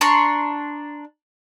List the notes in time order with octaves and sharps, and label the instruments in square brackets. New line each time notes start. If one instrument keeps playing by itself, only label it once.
[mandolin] D4 A#5 C6 C#6